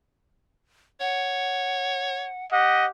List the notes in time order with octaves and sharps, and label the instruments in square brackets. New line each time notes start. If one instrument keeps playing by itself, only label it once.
[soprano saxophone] C#5 [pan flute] F#5
[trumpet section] G4 D#5 [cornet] F#5